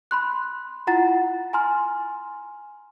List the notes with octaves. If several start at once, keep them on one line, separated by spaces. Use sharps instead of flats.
B5 C6 F#6
E4 F4 F#5 A#5 A6
G#5 A#5 C6 F6